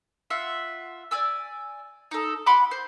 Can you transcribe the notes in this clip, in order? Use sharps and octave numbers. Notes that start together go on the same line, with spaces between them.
F4 E5 F#5
D5 G#5 E6
D#4 A4
F#5 B5 C6 D6
C5